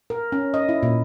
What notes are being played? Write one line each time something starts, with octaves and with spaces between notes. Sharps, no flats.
A#4
C#4
D#5
E4
A#2